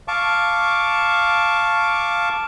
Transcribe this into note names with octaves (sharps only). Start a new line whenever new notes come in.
F5 A5 C#6 D6